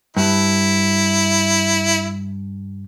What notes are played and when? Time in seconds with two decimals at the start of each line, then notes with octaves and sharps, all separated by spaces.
0.17 G2 E4